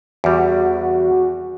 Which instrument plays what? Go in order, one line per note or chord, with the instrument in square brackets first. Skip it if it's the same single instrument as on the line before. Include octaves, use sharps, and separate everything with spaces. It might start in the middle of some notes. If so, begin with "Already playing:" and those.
[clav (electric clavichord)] E2 G3 [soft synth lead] F#4